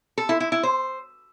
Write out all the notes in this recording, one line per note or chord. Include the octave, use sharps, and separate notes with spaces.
A4
E4
E4
E4
C5